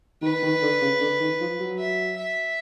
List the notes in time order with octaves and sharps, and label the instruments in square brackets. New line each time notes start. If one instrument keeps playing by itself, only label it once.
[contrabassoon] D#3 [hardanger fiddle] B4
[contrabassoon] D#3
D3
C#3
D3
D#3
F3
F#3
[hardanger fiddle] E5
E5